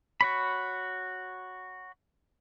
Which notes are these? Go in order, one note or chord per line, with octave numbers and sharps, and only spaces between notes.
F#4 C#5 B5